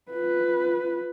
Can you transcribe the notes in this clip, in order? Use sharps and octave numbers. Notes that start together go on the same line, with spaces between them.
F4 B4